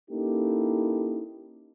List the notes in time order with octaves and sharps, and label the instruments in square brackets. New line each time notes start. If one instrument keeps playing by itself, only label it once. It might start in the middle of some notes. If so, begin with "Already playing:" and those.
[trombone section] A#3 C#4 D#4 E4 G4 A4